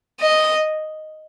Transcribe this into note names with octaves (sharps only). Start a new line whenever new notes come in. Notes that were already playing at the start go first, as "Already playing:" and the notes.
D#5